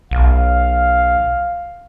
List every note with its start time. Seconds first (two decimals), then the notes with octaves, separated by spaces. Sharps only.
0.11 B1 F5